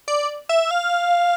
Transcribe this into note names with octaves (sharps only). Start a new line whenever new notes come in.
D5
E5
F5